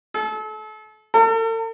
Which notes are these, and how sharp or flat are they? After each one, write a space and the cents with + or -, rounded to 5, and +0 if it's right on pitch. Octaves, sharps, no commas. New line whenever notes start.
A4 -35
A4 +45